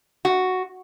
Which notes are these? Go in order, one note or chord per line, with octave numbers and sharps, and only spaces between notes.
F#4